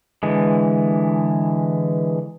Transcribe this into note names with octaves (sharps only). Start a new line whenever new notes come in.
D3 E3 G#3